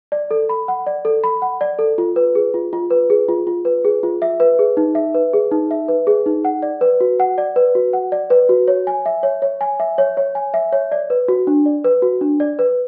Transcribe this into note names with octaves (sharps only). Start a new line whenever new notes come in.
D5
A4
B5
F#5
D5
A4
B5
F#5
D5
A4
F4
B4
G#4
F4
F4
B4
G#4
F4
F4
B4
G#4
F4
E5
B4
G#4
D#4
E5
B4
G#4
D#4
E5
B4
G#4
D#4
F#5
D5
B4
F#4
F#5
D5
B4
F#4
F#5
D5
B4
F#4
C#5
G#5
E5
C#5
C#5
G#5
E5
C#5
C#5
G#5
E5
C#5
D5
B4
F#4
D4
D5
B4
F#4
D4
D5
B4